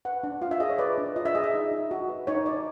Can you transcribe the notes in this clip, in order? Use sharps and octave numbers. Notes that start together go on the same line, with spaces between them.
B4 F#5
D4
F4 F5
E5
G#4 D#5
C#5
B4 D5
D4
F4 D#5
E5
G#4 D#5
E5
D#4
D#4
F#4
B4
D#4 C#5
D#4 D5